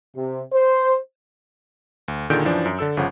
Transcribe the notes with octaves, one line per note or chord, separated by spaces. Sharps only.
C3
C5
D2
A#2 D3 D#3 G#4 G6 D7
F#2 E3 F3 D4
F#2
D3 A4 E6
G1 C#3 F3 C#5 F#5